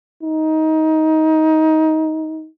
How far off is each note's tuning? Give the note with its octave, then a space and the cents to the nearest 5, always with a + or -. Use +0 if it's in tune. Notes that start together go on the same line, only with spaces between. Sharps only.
D#4 +20